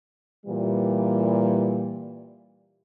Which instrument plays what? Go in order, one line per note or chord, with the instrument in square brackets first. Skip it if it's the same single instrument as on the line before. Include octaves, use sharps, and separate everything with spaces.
[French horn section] A#2 E3 G3